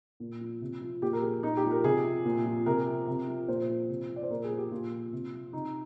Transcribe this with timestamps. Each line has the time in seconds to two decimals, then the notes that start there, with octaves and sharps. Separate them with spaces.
0.20 A#2
0.41 F3
0.61 C3
0.81 F3
1.02 A#2 G4
1.13 A#4
1.23 F3 G#4
1.43 A#2 D#4
1.57 G4
1.64 F3
1.71 A#4
1.84 C3 G#4
2.04 F3
2.25 A#2
2.45 F3
2.66 C3 A#4
2.87 F3
3.07 C3
3.27 F3
3.48 A#2 C5
3.69 F3
3.89 C3
4.10 F3
4.16 D5
4.23 C5
4.30 A#2 A#4
4.44 G#4
4.51 F3
4.58 G4
4.71 A#2 F4
4.92 F3
5.13 C3
5.33 F3
5.53 C3 D#4